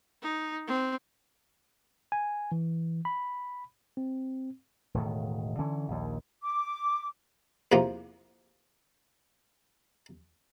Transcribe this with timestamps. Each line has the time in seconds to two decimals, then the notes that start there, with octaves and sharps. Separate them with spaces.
0.22 D#4
0.67 C4
2.12 G#5
2.52 E3
3.05 B5
3.97 C4
4.94 E1 A2 D#3
5.59 D3 E3 C#4
5.88 A#1 D#2
6.42 D6
7.72 E2 C3 F3 A#3